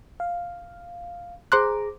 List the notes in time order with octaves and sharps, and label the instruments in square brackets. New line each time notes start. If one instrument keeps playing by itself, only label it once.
[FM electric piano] F5
[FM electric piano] G#4 A#5 D6 [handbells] C5 C6 F#6